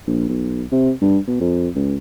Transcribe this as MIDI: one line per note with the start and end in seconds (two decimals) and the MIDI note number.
0.07 0.28 34
0.29 0.63 35
0.72 0.91 48
1.01 1.18 43
1.27 1.36 47
1.40 1.68 41
1.75 1.96 37